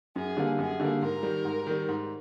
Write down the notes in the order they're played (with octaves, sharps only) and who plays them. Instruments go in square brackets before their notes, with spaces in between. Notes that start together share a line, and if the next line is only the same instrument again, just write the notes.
[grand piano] F#2 [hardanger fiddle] G#4
[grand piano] D3 G3 A#3
[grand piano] F#2 [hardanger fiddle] G#4
[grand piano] D3 G3 A#3
[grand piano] G#2 [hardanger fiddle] A#4
[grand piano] D#3 G3
G#2
D#3 G3
G#2